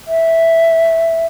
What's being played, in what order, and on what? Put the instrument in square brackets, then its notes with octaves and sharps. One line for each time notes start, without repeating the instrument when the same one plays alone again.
[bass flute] E5